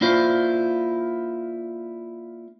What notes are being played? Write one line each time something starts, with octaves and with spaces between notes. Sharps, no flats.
A#3 D4 E4 F4 C5